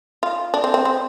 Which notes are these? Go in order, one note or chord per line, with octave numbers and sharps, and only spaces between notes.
F4
D4
C4
C4
C4